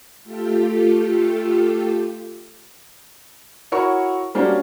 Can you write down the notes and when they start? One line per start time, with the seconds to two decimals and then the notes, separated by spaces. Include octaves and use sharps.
0.24 A3 F4 G4 A4
3.72 E4 F#4 A#4 C#5 C#6
4.35 G3 A#3 C#4 D4 F#4 C5